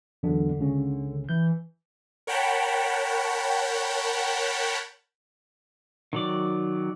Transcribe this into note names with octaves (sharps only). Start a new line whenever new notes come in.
E2 D3 F#3 D4
C#2 C#3 C#4
E3 G6
A#4 C#5 F#5 G5 A5 B5
D#3 F#3 D5